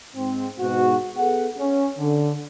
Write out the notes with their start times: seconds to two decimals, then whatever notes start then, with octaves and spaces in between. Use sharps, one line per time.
0.16 G#2 C4
0.60 G#2 B2 F#4
1.17 B3 G#4 A4 F#5
1.59 C#4
1.99 D3